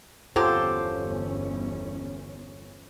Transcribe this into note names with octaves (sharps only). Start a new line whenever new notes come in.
G1 E2 F#3 C#4 F4 G4 A4 C5